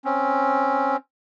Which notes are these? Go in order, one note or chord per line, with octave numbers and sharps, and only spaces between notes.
C4 C#4